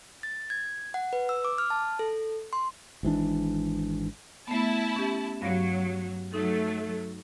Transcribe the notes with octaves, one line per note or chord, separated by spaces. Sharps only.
A6
G#6
F#5
B4
E6
D6
F6
A5
A4
C6
G#1 G#2 E3 D4
A3 B3 E4 A5
C#4 G4
G2 F#3 F5 A#6
F#3 A3 D#4